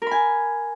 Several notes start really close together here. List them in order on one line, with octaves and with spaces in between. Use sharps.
A#4 B5 G#5